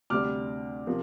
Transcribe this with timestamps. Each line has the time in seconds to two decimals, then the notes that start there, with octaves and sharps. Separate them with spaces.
0.10 D2 C3 G3 D4 D6 F6
0.87 C3 F3 A#3